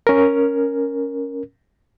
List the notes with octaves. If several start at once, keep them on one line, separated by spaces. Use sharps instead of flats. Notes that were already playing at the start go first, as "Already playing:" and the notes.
C#4 A#4